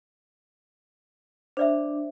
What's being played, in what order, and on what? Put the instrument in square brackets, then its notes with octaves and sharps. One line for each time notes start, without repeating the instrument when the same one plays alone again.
[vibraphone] D4 [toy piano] C5 D5 E5